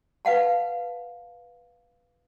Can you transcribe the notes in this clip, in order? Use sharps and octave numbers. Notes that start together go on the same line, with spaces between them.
B4 F5 F#5 A5